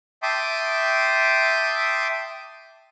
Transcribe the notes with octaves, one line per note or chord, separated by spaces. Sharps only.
E5 G5 A5 C6 D6 D#6